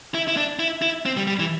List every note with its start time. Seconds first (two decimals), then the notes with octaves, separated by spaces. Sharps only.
0.14 E4
0.28 E4
0.36 D4
0.59 E4
0.82 E4
1.06 C4
1.17 G3
1.27 G3
1.39 E3